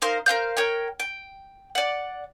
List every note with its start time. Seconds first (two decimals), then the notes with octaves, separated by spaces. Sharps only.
0.02 D#4 A#4 C5 F5
0.26 A#4 C5 F5 G6
0.57 A#4 C#5 G5
1.00 G5
1.75 D5 F#5